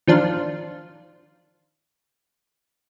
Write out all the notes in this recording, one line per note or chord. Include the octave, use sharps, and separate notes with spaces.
D#3 F3 D4 F5